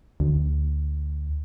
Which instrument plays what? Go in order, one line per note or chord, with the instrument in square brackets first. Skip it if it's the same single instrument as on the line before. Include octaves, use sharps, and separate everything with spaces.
[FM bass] D2